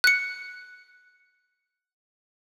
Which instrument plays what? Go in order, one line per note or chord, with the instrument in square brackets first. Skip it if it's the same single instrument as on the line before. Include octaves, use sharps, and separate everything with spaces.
[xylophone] F#6 C#7